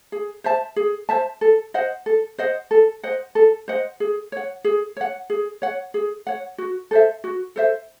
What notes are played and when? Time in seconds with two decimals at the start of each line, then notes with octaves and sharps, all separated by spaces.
0.12 G#4
0.44 C5 E5 A5
0.76 G#4
1.09 C5 E5 A5
1.41 A4
1.74 C5 D#5 F#5
2.06 A4
2.38 C5 D#5 F#5
2.71 A4
3.03 C5 D#5 F#5
3.35 A4
3.68 C5 D#5 F#5
4.00 G#4
4.32 C#5 F#5
4.64 G#4
4.97 C#5 F#5
5.30 G#4
5.62 C#5 F#5
5.94 G#4
6.27 C#5 F#5
6.58 F#4
6.91 A4 C5 E5
7.24 F#4
7.56 A4 C5 E5